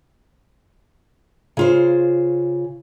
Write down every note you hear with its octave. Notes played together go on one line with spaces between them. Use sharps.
C#3 F4 C5